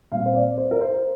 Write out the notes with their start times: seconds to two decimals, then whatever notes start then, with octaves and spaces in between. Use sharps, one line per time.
0.12 A#2 G3 C4 F5
0.26 C5
0.35 D5
0.58 C5
0.71 A#4
0.81 C5